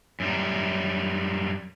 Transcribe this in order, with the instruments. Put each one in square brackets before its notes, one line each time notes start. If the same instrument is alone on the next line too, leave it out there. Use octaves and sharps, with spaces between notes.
[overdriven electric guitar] F#2 G3